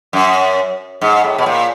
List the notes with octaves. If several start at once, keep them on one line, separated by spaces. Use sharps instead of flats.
F#2
G#2
A2
B2
A#2